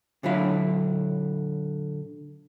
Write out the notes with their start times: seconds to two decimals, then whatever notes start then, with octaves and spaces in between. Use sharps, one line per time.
0.23 A#2 D3 F#3 E4 F5